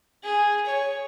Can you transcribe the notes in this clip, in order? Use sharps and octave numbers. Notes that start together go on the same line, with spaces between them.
G#4
C#5